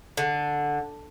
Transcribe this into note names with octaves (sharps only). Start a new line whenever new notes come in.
D3